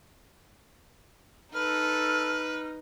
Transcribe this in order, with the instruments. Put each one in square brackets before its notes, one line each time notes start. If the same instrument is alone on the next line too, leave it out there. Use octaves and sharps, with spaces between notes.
[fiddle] D#4 [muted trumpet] A4 [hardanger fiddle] B4 [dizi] F6